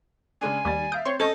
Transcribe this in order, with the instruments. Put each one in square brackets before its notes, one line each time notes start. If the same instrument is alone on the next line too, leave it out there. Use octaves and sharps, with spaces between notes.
[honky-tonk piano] C#3 G#3 D4 [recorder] G#5
[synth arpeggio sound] D#2 [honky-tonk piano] G3 A6
[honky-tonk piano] E5 F5 G6 [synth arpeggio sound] D#6 D7
[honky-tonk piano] C4 [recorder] C#5 [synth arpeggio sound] C6 C#6
[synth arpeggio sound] C#4 [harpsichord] A4 [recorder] D#5